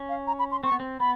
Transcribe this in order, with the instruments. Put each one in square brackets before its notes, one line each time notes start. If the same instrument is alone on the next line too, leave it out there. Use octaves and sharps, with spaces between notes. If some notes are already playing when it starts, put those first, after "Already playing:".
Already playing: [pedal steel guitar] C#4
[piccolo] F5
A#5
B5
C6
[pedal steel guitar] C4 [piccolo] C#6
[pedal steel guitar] B3
C4
[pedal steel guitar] B3 [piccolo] B5